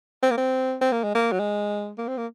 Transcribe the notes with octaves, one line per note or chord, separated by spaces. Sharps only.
C4
A#3
C4
C4
A#3
G#3
A#3
F#3
G#3
A#3
C4
A#3